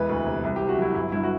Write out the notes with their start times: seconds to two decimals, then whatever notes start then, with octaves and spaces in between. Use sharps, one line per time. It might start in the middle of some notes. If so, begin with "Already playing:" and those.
Already playing: E1 E3 B4
0.09 D2
0.26 C3
0.44 C2
0.56 G4
0.61 C3
0.69 F#4
0.78 F#3 E4
0.95 G1 E4
1.12 G2 E4
1.23 F#4